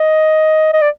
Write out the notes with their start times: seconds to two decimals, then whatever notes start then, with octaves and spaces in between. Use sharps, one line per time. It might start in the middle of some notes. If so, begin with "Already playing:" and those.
Already playing: D#5
0.73 D#5
0.82 D5